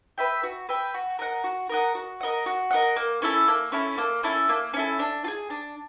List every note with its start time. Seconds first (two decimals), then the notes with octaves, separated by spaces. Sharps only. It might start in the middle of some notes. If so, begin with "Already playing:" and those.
0.18 B4 E5 G5
0.43 F#4
0.69 B4 E5 G5
0.94 F#4
1.19 A#4 D#5 F#5
1.44 F#4
1.69 A#4 D#5 F#5
1.95 F#4
2.21 A#4 D#5 F#5
2.46 F#4
2.71 A#4 D#5 F#5
2.96 A#3
3.22 C#4 E4 A4
3.48 A#3
3.72 C#4 E4 A4
3.98 A#3
4.23 C#4 E4 A4
4.49 A#3
4.74 C#4 E4 A4
4.99 D4
5.24 F4
5.28 G#4
5.50 D4